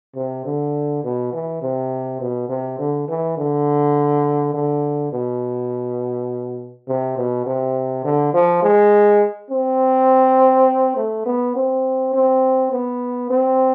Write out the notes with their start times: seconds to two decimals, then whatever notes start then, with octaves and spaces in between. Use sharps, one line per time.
0.15 C3
0.45 D3
1.04 B2
1.33 E3
1.62 C3
2.20 B2
2.49 C3
2.79 D3
3.08 E3
3.37 D3
4.54 D3
5.12 B2
6.88 C3
7.17 B2
7.46 C3
8.04 D3
8.33 F3
8.63 G#3
9.51 C4
10.96 A3
11.26 B3
11.55 C4
12.14 C4
12.72 B3
13.30 C4